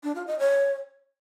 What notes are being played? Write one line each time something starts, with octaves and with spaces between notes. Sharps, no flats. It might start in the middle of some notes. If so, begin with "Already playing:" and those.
D4
F4
D#5
C#5